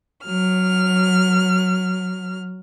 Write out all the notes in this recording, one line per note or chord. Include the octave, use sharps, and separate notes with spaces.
F#3 F6